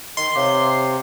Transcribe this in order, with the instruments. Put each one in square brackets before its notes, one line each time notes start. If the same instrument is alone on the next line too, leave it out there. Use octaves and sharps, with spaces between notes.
[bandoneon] D#3 [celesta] D#5 [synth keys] C6
[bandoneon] C3 [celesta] C#5 F5 D6